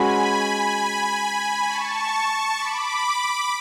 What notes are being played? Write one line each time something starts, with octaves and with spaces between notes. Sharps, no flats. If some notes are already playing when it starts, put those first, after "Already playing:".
Already playing: G#3 C#4 F#4 B4 G#5 B5
A5 C#6
B5 D6